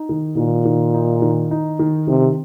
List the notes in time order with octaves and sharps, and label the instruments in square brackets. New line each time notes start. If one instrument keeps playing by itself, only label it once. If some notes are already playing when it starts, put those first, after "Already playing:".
Already playing: [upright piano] D#4
D#3
[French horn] A#2 [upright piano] D#3
[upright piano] D#3
D#4
D#3
D#4
D#3
[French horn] C3 [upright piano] D#3